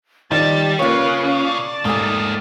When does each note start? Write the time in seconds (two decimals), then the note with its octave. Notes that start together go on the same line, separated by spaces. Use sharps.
0.31 D#3 F3 G3 D#4 D5 A5 A6
0.79 C#3 A#3 C#4 F4 A#4 B4 C#5 F5
1.42 D5 A5
1.85 G#2 A3 A#3 C4 G#5 D#6